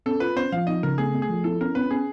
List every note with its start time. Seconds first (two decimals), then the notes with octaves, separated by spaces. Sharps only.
0.06 C#4 A4
0.20 F4 B4
0.36 C#4 C5
0.52 F3 F5
0.67 D#4 D#5
0.83 C#3 A#4
0.98 A3 G#4
1.14 A3
1.22 G#4
1.29 F3
1.44 E4 A4
1.60 C#4 A#4
1.75 C#4 B4
1.91 C#4 G#4